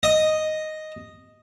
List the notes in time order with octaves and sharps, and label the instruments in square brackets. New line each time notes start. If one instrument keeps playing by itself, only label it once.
[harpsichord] D#5